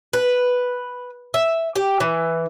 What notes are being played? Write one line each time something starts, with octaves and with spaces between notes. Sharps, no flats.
B4
E5
G4
E3